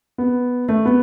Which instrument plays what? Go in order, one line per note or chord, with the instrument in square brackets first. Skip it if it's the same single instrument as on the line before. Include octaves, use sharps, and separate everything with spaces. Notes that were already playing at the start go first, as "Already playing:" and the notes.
[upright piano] B3
A3
B3